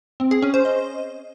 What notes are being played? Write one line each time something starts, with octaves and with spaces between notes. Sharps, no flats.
C4
G#4
C#4
C5
D#5